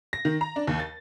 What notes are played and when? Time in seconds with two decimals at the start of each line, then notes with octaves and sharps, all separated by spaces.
0.13 A#6
0.25 D#3
0.41 A#5
0.56 D4
0.67 D#2
0.79 A6